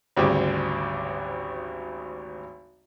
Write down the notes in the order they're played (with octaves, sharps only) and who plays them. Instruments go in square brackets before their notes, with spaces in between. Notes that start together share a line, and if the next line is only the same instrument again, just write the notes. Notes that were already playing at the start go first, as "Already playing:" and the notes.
[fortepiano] G#1 D2 C#3 G3 G4